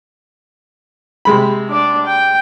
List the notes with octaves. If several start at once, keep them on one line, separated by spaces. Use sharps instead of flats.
C3 G#3 B5
D4 D5
G5